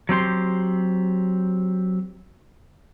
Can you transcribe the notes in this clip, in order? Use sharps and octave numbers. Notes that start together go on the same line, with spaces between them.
F#3 C4 G4 C6